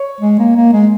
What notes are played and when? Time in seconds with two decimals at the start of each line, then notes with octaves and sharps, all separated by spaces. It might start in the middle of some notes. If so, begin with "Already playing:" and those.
Already playing: C#5
0.21 G#3
0.39 A#3
0.56 A#3
0.73 G#3